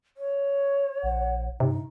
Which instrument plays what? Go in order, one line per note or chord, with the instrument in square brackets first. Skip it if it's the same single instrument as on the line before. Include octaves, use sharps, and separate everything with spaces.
[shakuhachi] C#5
[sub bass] A#1 [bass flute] F#5
[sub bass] G2 [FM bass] C3 [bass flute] D#4